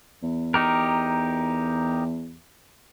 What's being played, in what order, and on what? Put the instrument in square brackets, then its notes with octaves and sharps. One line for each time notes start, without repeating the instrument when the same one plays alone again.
[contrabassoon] E2
[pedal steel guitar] D#4 G4 A#4